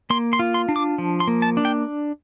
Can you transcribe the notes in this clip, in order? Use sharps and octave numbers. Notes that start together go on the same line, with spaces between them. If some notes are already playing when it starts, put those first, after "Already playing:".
A#3 C6
C6
F4
C6
D4
D6
F3
C6
A#3
A5
D4
G5